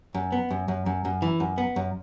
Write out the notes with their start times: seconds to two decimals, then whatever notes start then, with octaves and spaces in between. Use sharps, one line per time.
0.15 F#2
0.32 B3
0.51 F#2
0.68 F#2
0.86 F#2
1.05 F#2
1.22 E3
1.40 F#2
1.58 B3
1.76 F#2